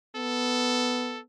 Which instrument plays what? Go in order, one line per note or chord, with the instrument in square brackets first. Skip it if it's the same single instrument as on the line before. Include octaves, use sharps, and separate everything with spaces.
[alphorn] B3 [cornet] A4